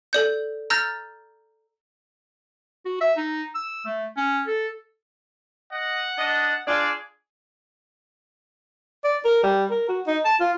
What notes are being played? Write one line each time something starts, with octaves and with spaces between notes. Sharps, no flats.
A4 D5 G6
A#5 E6 F6 G6 A6 A#6
F#4
E5
D#4
E6
A3
C#4
A4
D#5 F#5
D4 D#5
D4 F4 G#4 D5
D5
A#4
G3
A#4
F#4
D#4
A5
F4